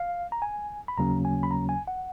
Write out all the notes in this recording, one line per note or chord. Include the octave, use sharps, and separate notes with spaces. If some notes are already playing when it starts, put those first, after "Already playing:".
Already playing: F5
A#5
G#5
B5
D#2 C#3 F#3 A#3 C#4 A#5
G#5
B5
A#5
G#5
F#5